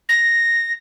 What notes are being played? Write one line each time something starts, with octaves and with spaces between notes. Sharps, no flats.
A#6